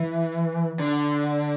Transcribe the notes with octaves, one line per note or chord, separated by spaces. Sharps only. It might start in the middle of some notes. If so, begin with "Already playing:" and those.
Already playing: E3
D3